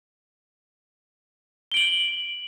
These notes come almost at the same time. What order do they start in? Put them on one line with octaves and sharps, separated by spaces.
G7 D7 F#7